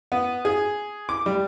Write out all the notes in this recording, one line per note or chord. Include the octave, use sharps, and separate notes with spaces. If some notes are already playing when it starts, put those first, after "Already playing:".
B3
G#4
D6
G3